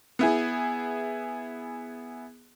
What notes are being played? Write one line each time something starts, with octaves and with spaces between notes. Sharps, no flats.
B3 E4 G#4